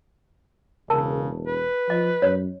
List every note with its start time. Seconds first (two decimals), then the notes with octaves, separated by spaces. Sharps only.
0.90 E1 C#3 A#4 A5
1.47 B4
1.90 F3 D#5
2.22 F#2 C#5